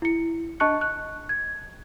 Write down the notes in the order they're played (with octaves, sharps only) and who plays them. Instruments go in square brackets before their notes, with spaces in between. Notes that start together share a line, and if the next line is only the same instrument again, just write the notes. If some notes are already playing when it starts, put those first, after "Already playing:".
[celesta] E4 C#7
D4 D#5 A5 C#6 F#6 C#7
F#6
G#6